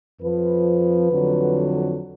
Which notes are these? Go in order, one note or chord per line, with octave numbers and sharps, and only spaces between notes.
F2 F3 B4
F2 D3 F#3